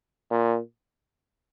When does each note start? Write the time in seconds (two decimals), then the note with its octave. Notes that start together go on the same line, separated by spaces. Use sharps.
0.31 A#2